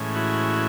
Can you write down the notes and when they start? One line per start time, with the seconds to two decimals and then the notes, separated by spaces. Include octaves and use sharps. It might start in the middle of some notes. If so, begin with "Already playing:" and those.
Already playing: A2 E3 G#3 C#4
0.15 E4 F#4